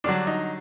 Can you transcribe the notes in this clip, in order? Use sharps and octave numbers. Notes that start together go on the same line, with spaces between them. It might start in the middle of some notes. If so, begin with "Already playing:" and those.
G2 D3 F#3 D4
D#4